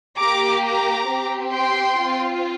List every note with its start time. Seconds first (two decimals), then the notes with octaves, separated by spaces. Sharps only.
0.19 A#3 G4 A#5 D6
0.64 A#5 D6
1.09 C4 G4
1.53 G5 C6
1.98 C4 F4